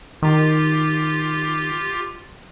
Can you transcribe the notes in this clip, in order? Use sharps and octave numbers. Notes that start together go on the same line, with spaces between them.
D#3 F4 G4